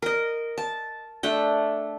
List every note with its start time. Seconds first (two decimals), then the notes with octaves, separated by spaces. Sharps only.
0.02 A#4 D#5
0.58 A5
1.23 A3 D4 G5